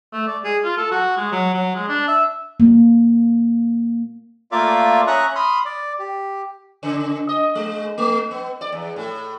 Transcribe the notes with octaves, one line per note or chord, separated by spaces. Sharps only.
A3
D5
G#4
F4
A4
F#4
G#3
F#3
F#3
G#3
D4
E5
A#3
A3 A#3 F4 D5 E5 F5
C#4 E5 A#5 C#6 D#6 F#6
B5 C6 D#6 F6
D5
G4
C#3
D#5
G#3
A3
B3
D5
E2
A2